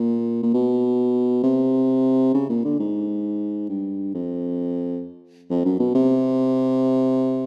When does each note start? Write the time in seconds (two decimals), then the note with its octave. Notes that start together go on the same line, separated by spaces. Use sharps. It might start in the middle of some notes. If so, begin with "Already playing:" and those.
Already playing: A#2
0.43 A#2
0.54 B2
1.43 C3
2.34 C#3
2.49 A#2
2.65 D3
2.79 G#2
3.69 G2
4.14 F2
5.50 F2
5.65 F#2
5.80 B2
5.95 C3